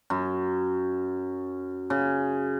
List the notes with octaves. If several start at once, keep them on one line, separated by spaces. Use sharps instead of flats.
F#2
C#3